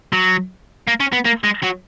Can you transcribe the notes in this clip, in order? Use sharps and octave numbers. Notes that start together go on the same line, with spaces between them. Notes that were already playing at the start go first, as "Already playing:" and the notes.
F#3
A#3
C#4
B3
A#3
G#3
F#3